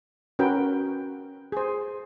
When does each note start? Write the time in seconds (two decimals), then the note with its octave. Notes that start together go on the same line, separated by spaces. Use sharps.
0.39 C#4 F#4 A#4 B4 G5
1.52 G#4 C5